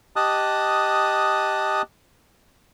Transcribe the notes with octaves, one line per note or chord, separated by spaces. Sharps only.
G4 D#5 A5 D#6 F#6